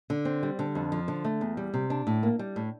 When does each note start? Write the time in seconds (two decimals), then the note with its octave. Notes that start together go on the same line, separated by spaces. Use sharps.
0.10 D3
0.25 C4
0.43 G3
0.59 D3
0.75 F2
0.92 F3
1.08 D3
1.24 A3
1.41 E2
1.57 G3
1.74 C3
1.90 D4
2.07 A2
2.23 A#3
2.39 G3
2.56 A2